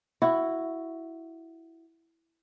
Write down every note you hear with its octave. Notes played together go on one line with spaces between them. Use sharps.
E4 F#4